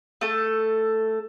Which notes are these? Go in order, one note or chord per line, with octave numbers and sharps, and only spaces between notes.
A3 A4